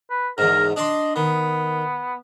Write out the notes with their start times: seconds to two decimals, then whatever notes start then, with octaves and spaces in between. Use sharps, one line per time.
0.10 B4
0.38 E2 G#2 A#4
0.76 D4 D5 D#5 C6
1.16 D#3 B3